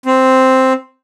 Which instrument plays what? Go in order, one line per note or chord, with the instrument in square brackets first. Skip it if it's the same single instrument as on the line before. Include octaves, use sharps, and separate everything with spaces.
[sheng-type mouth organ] C4